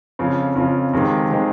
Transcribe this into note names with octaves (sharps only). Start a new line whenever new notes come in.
F2 C#3 F3
F2 C#3 F3
F2 C3 D#3 G#3 C4
C3 D#3 G#3 C4